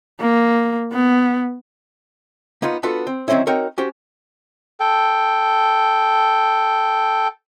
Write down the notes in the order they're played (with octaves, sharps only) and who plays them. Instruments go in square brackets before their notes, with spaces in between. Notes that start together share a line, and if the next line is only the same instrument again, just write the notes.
[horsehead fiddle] A#3
B3
[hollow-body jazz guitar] A#3 B3 D#4 F4
B3 D4 F4 F#4 A4 B4
C4
D#3 F#3 A#3 C4 C#4 E4
C4 D#4 F#4 A#4 C#5
C#4 F#4 G4 C5
[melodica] A4 G5